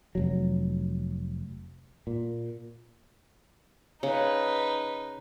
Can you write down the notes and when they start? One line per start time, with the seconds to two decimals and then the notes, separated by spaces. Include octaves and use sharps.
0.15 F1 F#3
2.07 A#2
4.03 C#3 D#4 B4